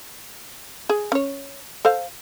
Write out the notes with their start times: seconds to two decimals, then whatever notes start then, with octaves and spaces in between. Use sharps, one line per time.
0.89 G#4
1.12 C#4 C#5
1.85 A4 C5 F5